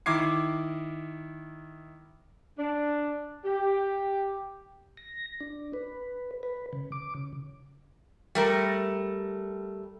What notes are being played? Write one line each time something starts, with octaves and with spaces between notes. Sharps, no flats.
D#3 E4 D6 G#6 C7
D4
G4
A#6
D4
B4
B4
C#3
D6
C#3
G3 A3 A#4